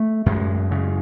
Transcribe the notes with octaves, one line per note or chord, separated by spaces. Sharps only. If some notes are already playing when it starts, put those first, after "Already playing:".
Already playing: A3
F#2 G#3
C#3